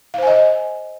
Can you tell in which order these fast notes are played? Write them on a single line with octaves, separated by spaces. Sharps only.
F5 C5 G#5 D#5